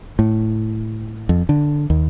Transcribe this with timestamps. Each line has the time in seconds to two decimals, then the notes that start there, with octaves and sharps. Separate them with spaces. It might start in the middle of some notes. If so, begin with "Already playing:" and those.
0.19 A2
1.29 F2
1.49 D3
1.90 D#2